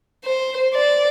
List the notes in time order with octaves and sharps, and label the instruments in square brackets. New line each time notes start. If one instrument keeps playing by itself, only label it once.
[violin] C5
D5